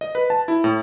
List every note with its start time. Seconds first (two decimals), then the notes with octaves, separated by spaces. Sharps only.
0.01 D#5
0.15 B4
0.30 A5
0.48 E4
0.64 A2